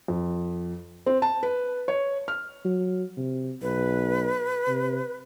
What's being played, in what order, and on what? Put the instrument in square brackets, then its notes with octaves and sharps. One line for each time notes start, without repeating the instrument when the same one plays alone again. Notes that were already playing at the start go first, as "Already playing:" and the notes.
[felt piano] F2
C4
A5
B4
C#5
F6
[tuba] F#3
C3
[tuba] B1 [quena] B4
[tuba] C3